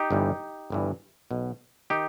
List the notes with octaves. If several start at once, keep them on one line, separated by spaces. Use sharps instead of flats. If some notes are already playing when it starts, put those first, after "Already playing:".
Already playing: D#4 G4
G1 G2 E3
G1 G2 E3
B1 B2
D#3 D#4 G4